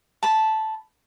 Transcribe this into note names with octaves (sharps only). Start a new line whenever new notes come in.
A5 B5